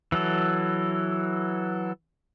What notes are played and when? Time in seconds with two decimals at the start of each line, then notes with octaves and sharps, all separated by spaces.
0.12 E3 F#3 A4